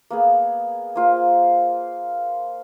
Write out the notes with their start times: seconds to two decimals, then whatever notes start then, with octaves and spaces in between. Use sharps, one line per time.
0.10 A#3 B3 G#4
0.96 A#3 F4 C5